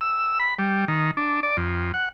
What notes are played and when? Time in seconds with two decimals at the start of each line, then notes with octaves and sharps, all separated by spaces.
0.01 E6
0.40 B5
0.59 G3
0.88 D#3
1.17 D4
1.43 D5
1.57 F2
1.94 F#5